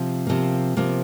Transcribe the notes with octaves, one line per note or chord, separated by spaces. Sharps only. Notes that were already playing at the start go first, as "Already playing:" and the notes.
Already playing: C3 F3
C3 F3 A#3
C3 F3 A#3